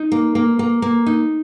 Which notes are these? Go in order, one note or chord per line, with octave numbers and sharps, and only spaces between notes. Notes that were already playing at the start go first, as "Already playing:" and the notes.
Already playing: D#4
A#3
A#3
A#3
A#3
D#4